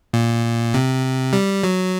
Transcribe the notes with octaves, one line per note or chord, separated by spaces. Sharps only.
A#2
C3
G3
F#3